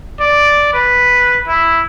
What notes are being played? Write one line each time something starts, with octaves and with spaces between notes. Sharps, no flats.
D5
B4
E4